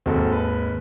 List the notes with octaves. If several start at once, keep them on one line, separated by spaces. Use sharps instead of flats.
G#1 D#2 C4 F#4 A4
B4